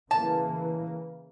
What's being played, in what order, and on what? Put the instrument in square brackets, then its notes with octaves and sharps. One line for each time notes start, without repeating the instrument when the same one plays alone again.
[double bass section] C#3 E3 A#3 [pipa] A5